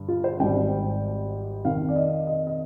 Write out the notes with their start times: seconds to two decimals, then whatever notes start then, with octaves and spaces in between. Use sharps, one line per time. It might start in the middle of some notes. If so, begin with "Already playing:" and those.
Already playing: G2 D3
0.08 F4
0.24 C5
0.40 G#1 G#2 G3 G5
1.65 F2 C3 D#3 F5
1.89 D5
1.96 D#5
2.27 D#5
2.47 D#5